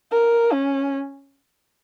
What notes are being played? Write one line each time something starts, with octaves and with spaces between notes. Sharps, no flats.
A#4
C#4